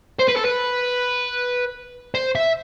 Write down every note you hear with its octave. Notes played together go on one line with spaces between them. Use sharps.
C5
B4
A4
B4
C5
E5